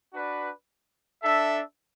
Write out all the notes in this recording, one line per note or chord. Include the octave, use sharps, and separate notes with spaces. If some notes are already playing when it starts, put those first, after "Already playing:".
D4 F#4 B4 D5
D4 A4 E5